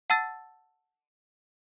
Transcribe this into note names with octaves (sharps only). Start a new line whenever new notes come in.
F#5 A5 E6 A6